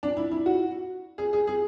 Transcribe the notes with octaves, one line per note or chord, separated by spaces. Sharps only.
D4
E4
E4
F#4
G#4
G#4
G#4